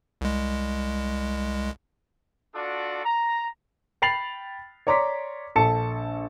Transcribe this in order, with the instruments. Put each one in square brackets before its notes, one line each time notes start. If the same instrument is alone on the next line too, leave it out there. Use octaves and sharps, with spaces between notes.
[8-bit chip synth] C2 G#3
[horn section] D4 F4 F#4 A4 D5
A#5
[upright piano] G5 B5 A6 C7 F7 F#7
C#5 D5 A#5 C6 D6 B6
A#1 A4 A5 C#7